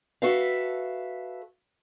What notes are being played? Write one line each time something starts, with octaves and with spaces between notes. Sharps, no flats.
F#4 A4 B4 E5 F5